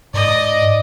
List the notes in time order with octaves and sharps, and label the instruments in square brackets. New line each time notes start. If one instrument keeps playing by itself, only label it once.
[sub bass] G#2 [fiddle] D5 D#5